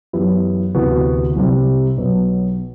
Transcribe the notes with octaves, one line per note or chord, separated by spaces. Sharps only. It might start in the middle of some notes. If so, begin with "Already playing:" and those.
F#2 E3 B3 E4 G4
D2 C3 E3 B3 F#4
C2 C3 G3
B1 B2 F#3 B3